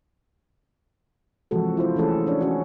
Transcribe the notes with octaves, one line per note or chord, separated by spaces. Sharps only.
C3 E3 F3 G#3 F#4 A4
E4 F4 C5
E3 A3 C#4 G#4 A4
C#4 D4 C#5
C#4 F#4